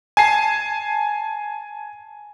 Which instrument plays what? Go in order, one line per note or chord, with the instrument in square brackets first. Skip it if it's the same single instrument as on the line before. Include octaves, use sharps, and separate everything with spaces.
[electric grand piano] G#5 A5 C7